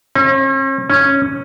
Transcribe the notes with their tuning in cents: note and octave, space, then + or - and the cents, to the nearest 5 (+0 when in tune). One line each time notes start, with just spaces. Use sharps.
C#4 -45
C#4 -5